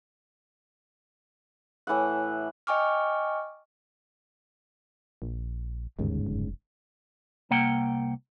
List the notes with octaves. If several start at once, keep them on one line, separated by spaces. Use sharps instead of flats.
A2 E3 E5 F#5
D#5 G5 G#5 C#6 D6 F6
A#1
G1 D#2 G#2 C#3
F1
C2 A#3 F#5 G5